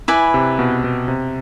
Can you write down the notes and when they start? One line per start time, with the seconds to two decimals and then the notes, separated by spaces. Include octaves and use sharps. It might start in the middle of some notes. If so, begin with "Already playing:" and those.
0.08 E4 B4 D5 G#5
0.34 C3
0.59 B2
0.84 B2
1.08 C3